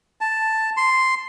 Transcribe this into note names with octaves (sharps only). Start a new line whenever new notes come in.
A5
C6